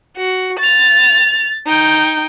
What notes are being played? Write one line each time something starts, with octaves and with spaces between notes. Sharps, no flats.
F#4
A6 F7
D#4 G5